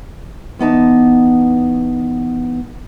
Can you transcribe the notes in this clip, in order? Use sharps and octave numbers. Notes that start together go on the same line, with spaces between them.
E2 B3 D#4 A5